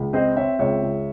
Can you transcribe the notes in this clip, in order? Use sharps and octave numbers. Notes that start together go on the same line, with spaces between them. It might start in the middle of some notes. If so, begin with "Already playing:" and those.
Already playing: C#2
C4 C5 D#5
C4 C#5 E5
C#2 C#5 E5
C#2